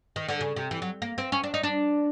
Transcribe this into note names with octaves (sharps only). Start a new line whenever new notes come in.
D#3
D3
C#3
C3
E3
F#3
A#3
C4
C#4
D4
D#4
D4